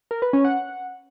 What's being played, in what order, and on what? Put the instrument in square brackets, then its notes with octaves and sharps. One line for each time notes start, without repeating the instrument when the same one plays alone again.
[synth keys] A#4
B4
C#4
F#5